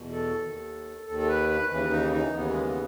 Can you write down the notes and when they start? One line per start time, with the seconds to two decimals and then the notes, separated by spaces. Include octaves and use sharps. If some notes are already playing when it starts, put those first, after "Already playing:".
Already playing: E2 B2
0.12 A4
0.44 D#2 D#3
1.06 D#2 A4
1.11 D#3
1.19 A4
1.28 B4
1.49 B4
1.70 D#2 C#3 E3 B4
1.91 D#4
2.13 D#4
2.33 D#2 C#3 E3 B3
2.50 G#3
2.64 B3